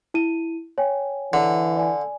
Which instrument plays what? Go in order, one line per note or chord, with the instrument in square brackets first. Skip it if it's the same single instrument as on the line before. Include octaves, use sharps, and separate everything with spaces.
[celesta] E4 D#7
C#5 G5 G#5
[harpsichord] D3 [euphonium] E3
[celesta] D5 G#5